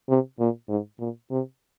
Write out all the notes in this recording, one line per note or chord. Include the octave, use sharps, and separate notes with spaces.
C3
A#2
G#2
A#2
C3